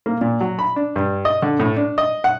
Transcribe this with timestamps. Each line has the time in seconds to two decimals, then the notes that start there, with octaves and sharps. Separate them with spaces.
0.06 A#3
0.21 A#2
0.41 F#3
0.59 B5
0.76 D4
0.96 G2
1.25 D#5
1.42 D3
1.59 A2
1.77 D4
1.98 D#5
2.24 F#5